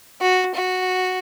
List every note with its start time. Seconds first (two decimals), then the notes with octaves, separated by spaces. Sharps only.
0.21 F#4
0.54 F#4